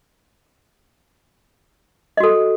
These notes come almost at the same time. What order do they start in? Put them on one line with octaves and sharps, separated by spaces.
D#5 F#4 A4